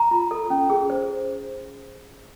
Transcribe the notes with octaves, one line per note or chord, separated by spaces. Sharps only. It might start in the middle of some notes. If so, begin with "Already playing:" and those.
Already playing: A#5
F4
A4
C#4
G#4
C5